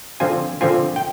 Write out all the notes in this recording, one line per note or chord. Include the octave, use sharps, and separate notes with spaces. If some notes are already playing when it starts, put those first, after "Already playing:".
D3 F3 C4 F4 G#5
D3 F3 C4 F4 G#5
G5